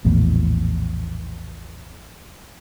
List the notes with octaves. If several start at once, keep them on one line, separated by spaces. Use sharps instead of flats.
A#1 E2 A2